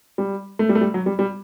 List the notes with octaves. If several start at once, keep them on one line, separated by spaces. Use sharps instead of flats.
G3
A3
G3
A3
G3
F#3
G3
G3